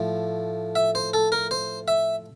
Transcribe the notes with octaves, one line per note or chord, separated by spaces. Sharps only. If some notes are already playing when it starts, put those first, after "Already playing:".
Already playing: A2 F3 A3
E5
C5
A4
A#4
C5
E5